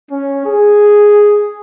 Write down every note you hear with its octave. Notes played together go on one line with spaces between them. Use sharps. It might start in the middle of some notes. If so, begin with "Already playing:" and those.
C#4
G#4